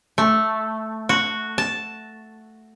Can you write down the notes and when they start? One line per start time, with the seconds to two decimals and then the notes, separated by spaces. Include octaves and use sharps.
0.18 A3
1.09 F#4
1.58 A5